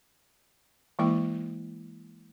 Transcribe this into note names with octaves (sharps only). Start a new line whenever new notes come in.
E3 G#3 A#3 E4 G5